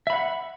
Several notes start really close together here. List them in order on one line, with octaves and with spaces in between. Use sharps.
E5 B5 F#5